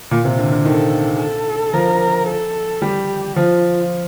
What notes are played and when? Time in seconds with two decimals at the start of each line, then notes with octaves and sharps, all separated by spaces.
0.11 A#2
0.25 C3
0.38 D3
0.52 D3
0.65 D#3 A4
1.19 A4
1.73 F3 A#4
2.27 A4
2.82 G3 G4
3.36 F3 F4